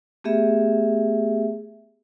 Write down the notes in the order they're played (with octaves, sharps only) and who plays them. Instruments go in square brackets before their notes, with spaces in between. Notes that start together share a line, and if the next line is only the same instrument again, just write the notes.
[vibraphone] A3 B3 G4 G#4 E5